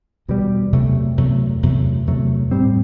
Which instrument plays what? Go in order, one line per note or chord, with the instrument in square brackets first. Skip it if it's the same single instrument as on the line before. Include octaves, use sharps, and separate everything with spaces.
[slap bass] E2 B2 G3
E2 C3 F#3 A3
E2 C3 F#3 A3
E2 C3 F#3 A3
E2 C3 F#3 A3
A2 G3 C4